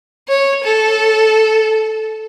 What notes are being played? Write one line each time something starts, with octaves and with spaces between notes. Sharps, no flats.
C#5
A4